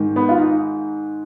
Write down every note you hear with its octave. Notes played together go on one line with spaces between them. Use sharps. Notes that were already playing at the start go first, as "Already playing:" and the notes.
Already playing: G#2 D#3
B3
F4
D#4